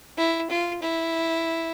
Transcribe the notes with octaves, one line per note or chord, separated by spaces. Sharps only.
E4
F4
E4